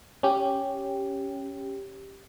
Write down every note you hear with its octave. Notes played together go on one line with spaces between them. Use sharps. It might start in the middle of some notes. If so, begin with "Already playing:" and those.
C#4 G4